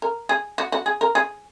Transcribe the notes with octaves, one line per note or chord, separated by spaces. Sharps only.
A#4
G#4
F#4
F#4
G#4
A#4
G#4